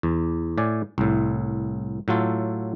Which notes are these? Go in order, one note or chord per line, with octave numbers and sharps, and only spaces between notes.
E2
A2 D5 G#5
C2 A2
A2 F#3 F4 A4